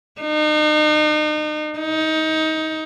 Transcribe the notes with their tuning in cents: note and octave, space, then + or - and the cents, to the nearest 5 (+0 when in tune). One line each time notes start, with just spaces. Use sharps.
D#4 -40
D#4 +20